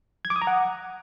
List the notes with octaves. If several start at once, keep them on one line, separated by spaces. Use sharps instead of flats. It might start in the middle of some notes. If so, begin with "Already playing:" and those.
G#6
D6
D#6
A#5
F#5